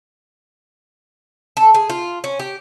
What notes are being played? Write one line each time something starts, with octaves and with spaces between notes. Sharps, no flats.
A4
G#4
F4
C#4
G4